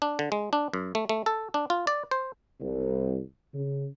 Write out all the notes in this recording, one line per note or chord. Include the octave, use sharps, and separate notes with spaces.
D4
D3
G#3
D4
F#2
A3
A3
A4
D4
F4
D5
C5
C2
C#3